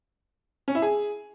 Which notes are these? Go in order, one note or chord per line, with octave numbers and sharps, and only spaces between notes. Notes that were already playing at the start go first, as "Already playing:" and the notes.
C#4
E4
G#4